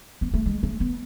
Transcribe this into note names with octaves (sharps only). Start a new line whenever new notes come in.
B3
A3
G#3
A3
B3